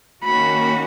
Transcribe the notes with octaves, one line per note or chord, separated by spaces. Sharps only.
D#3 A#3 C#4 F#4 B5